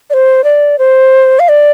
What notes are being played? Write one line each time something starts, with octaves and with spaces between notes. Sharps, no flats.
D5
C5
D5
C5
F5
D5